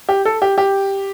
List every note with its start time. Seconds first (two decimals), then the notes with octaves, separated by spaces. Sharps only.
0.09 G4
0.25 A4
0.42 G4
0.58 G4